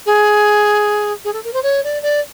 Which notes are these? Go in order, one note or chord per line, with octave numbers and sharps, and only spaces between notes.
G#4
G#4
A4
A#4
C5
C#5
D5
D5